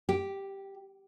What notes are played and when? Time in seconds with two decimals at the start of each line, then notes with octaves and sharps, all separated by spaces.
0.09 G4